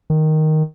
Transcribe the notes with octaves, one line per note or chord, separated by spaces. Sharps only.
D#3